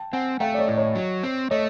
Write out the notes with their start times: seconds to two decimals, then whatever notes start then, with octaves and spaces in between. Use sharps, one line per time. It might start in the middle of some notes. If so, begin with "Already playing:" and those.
Already playing: G5 A5
0.13 C4 F#5 G#5
0.40 A3 F5 G5
0.54 D5
0.58 C#5 D#5
0.69 A2
0.77 C#5 D#5
0.95 F#3
1.24 C4
1.51 A3 C#5 D#5